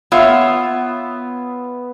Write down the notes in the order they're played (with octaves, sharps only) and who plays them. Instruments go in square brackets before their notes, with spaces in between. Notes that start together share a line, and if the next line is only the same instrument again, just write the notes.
[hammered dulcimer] B3 [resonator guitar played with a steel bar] F4 C#5 E5